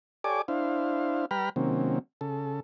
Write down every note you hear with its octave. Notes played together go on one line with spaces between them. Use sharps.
G4 A4 C#5 D5 G#5 D6
D4 E4 C5 F5
G3 B4 G5 A#5 B5 F6
C3 D#3 F#3 A#3 C4 C#4
C#3 A4